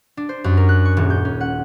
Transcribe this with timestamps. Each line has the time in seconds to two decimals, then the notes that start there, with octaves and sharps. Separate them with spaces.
0.17 D4
0.29 C5
0.44 F#2
0.57 A#4
0.69 F#6
0.85 C#6
0.97 D#1
1.10 G6
1.25 C#4
1.40 F#5